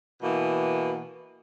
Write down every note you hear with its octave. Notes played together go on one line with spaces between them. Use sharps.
B2 E3 A#3